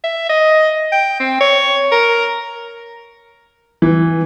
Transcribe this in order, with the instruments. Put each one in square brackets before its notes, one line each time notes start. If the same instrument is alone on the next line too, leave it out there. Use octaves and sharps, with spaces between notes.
[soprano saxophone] E5
D#5
G5
C4
C#5
A#4
[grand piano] E3